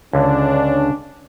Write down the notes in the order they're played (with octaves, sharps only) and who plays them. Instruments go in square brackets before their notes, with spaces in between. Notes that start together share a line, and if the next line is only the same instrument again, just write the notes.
[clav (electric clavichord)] C#2 D3 [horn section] C#4 D4